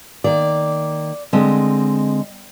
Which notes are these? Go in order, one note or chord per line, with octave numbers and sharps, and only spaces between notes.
D#3 A#3 D5
D3 G#3 C4 D#5